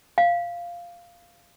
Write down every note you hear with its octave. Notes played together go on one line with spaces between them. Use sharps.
F5